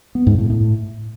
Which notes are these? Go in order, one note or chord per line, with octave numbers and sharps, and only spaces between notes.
B3
G#2
A2
A2